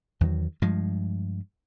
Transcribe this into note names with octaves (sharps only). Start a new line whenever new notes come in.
E2 D#3 F3 F#3
G2 F3 G#3